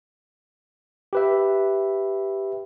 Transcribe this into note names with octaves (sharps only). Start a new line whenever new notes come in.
G4 B4 E5